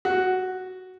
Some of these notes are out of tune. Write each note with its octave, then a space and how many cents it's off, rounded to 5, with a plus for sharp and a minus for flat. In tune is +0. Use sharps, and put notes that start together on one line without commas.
F#4 +5